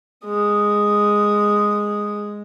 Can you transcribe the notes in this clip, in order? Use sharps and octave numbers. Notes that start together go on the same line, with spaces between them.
G#3 D#6